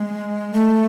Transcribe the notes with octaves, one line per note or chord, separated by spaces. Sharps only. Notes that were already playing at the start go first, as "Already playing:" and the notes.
Already playing: G#3
A3